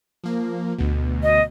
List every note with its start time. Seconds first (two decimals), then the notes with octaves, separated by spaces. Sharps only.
0.24 F3 A#3
0.78 D2 B2
1.23 D#5